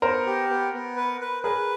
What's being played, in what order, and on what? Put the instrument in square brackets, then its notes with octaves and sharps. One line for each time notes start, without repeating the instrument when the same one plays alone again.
[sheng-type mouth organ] B3 [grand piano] A#4 C5
[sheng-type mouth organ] G4
B3
B3
B4
B4
[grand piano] G#4 A#4 [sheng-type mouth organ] B4